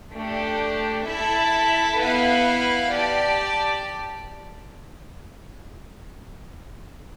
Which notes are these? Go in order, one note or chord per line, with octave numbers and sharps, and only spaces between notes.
A3 D4 G4
E4 A4 E5 A5
B3 E4 B4 F5
G4 D5 A5